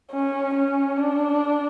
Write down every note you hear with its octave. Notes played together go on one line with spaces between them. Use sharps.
C#4
C#4
D4